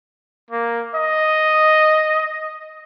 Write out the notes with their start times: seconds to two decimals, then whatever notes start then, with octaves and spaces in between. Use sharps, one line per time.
0.51 A#3
0.95 D#5